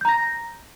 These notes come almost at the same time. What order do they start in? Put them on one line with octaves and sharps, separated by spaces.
G6 A#5 A#6